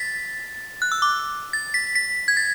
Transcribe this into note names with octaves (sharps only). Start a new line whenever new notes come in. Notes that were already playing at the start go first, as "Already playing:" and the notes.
Already playing: A6 B6
F#6
E6
D6
A6
B6
B6
G#6
A6